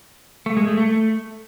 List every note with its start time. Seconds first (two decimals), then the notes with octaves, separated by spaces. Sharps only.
0.46 A3
0.57 G#3
0.67 A3
0.78 A3